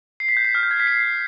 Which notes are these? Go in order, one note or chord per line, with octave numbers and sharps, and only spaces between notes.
C7
B6
G6
B6
F6
G6
G#6
B6
C7